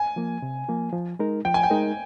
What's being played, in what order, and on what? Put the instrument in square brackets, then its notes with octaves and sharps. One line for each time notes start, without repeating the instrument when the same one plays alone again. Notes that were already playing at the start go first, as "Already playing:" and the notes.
Already playing: [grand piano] G#5
[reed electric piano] F3 A#3
C3
F3 A#3
F3
G#3 D#4 A#4
[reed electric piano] F3 [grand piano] G5
[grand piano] G#5
G5
[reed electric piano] G#3 D#4 A#4